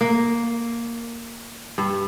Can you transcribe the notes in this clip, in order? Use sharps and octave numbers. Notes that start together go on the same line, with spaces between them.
A#3
G2